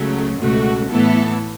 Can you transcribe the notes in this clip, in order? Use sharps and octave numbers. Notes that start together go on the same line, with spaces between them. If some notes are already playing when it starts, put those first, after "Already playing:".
Already playing: C#2 C#3 F#3 A3
C#2 B2 A3 F#4
A2 E3 B3 E4 A4